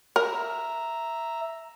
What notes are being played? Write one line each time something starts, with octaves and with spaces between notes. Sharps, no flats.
A#4 E5 A#5